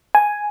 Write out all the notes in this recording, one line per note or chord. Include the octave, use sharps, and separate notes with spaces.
G#5